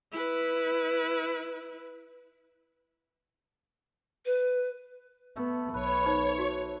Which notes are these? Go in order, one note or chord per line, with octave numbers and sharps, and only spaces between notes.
E4 B4
B4
A3 B3 A4
B1 B4 C#5
D#4 C5
F#4